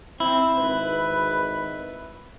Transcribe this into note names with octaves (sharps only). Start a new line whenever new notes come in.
C4 E4
G#1 B4